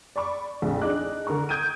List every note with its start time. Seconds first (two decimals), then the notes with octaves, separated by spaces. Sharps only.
0.16 D5 B5 C#6 D6
0.62 A#1 F2
0.82 D4 D#4 G#4 D6 F#6
1.27 D3 A#4 A#5 C#6
1.49 D#6 G6 G#6 D7 D#7